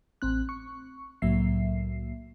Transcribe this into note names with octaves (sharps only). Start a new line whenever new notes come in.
A1 C4 F#6
C#6
C2 A2 F#3 A#3 E5 C7